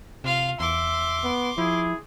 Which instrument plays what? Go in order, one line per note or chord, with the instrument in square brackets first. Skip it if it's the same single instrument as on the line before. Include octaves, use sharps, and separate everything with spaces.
[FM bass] C3 [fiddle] F4 F5
[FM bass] E2 [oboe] E5 [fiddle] C6 D6
[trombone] B3
[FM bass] F3 [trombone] E4 [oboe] G#4